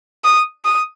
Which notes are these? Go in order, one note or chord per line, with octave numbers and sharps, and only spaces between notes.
D#6
D#6